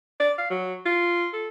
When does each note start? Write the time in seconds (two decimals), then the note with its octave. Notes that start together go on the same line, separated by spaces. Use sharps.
0.20 D5
0.38 F5
0.50 F#3
0.86 F4
1.33 A4